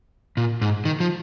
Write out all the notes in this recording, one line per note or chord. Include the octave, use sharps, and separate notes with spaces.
A#2
G#2
D#3
F3